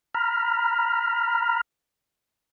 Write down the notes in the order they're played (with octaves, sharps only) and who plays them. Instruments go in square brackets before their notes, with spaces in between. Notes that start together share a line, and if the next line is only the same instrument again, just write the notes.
[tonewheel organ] A#5 B5 F6